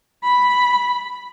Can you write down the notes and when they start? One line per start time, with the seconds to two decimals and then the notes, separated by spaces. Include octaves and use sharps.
0.23 B5